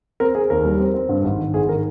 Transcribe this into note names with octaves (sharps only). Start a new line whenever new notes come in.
C4 A#4
C4 G#4
D#2 A#4
G3
C4
C4
G2
G#1
D#3
G#1 G#4
D#3 A#4